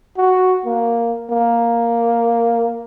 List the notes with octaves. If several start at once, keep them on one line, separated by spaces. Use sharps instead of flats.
F#4
A#3
A#3